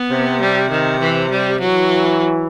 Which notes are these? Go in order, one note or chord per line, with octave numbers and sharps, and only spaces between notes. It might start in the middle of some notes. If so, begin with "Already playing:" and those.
Already playing: B3
C3
G3
D#3
E3
G3
E3 F#3